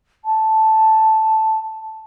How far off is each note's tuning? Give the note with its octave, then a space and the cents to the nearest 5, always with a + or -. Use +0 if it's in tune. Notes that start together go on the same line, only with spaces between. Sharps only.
A5 -5